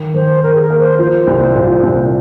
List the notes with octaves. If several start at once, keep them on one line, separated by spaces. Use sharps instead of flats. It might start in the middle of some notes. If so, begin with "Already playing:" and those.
Already playing: D#3
D#3 C5
D#3 A#4
G#4
A#4
A#3
C5
F3 C5
C2
A#2
C2